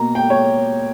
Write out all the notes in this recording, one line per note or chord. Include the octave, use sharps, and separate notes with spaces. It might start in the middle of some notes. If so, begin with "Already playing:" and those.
Already playing: B2 A#3 A#5
G5
C#5